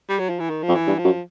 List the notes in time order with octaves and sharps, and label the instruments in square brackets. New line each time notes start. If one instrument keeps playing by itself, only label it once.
[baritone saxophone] G3
F#3
F3
E3
D#3
F3
[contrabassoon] F2
[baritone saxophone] E3
[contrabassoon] G2
[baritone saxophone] F3
[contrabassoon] F#2